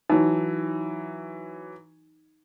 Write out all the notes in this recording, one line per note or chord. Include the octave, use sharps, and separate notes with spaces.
E3 F#3 D#4